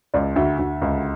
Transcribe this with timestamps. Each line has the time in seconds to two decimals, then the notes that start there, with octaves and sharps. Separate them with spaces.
0.14 C#2 D5
0.36 D2 E5
0.59 D2
0.81 C#2